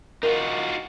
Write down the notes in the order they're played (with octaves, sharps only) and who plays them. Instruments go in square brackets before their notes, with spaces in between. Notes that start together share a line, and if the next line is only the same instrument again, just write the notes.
[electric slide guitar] D#4 F4 F#4 [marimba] A#4